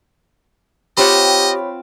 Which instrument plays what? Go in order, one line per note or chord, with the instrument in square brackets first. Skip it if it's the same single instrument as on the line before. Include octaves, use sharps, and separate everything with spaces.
[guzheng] C4 F4 F#5 [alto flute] G4 [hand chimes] C#5 B5 [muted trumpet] D#5